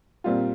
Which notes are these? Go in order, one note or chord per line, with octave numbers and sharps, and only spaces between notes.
A#2 G3 C4 F4